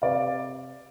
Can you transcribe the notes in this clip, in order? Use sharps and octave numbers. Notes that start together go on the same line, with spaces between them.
C3 D5 F5